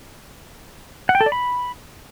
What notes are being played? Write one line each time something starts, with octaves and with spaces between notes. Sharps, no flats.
F#5
G5
A4
D5
B5